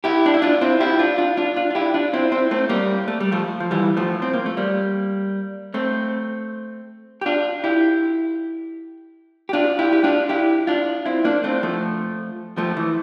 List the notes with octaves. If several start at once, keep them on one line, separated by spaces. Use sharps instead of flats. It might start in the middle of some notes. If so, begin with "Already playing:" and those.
E4 G4
D4
E4
D4 F4
C4 E4
E4 G4
D4 F4
D4 F4
D4 F4
D4 F4
F4
E4 G4
D4 F4
C4 E4
C4 E4
A3 C4
G3 A#3
A3
G3
F3 A3
F3
E3 G3
F3 A3
C4
A#3
A3
G3 A#3
A3 C4
G4
D4 F4
E4 G4
G4
D4 F4
E4 G4
G4
D4 F4
E4 G4
D4 F4
C4 E4
A#3 D4
A3 C4
F3 A3
F3 A3
E3